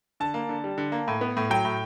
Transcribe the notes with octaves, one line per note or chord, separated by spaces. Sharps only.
D3 A5
A#3
D3
G3
D3
A#3
A2
B3
A2
F#3 G5
A2